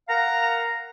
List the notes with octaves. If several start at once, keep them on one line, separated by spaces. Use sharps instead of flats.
A#4 F5 F#5 A#5